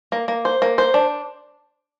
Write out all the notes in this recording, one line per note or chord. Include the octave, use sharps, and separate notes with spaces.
A#3
A#3
C5
A#3
C5
D4